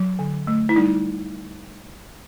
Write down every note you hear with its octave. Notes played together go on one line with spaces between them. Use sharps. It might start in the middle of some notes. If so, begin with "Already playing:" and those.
Already playing: F#3
D3
A3
E4
G3 D#4